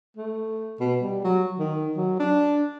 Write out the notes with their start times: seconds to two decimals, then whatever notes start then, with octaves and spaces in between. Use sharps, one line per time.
0.17 A3
0.80 B2
1.02 G3
1.24 F#3
1.59 D#3
1.97 F#3
2.20 D4